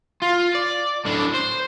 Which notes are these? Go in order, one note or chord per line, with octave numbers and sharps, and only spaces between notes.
F4
D5
A2 D4
C5